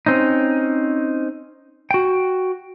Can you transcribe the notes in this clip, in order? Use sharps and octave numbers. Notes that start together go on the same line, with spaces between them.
C4 C#4 D#4
F#4 G5